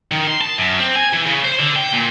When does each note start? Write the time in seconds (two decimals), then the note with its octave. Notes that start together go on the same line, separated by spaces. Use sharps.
0.12 D#3
0.27 C6
0.41 A5
0.58 F#2
0.80 C4
0.95 G#5
1.13 E3
1.27 C#3
1.45 C5
1.60 D3
1.76 G5
1.93 A#2